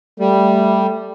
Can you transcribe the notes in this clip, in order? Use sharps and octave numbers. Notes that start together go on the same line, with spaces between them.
G3 A3